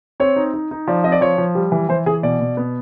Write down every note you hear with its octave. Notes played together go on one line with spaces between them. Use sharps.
C4 C#5
D#4
D#4
D#4
F3 D5
C4 D#5
D5
F3 C#5
F3
G3
E3
E3 C5
E3 G#4
B2 D5
B2
B3